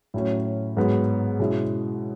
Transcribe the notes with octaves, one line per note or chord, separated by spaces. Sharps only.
A2 F#3 C#4
G#2 F#3 B3
B2 G#3 C#4 E4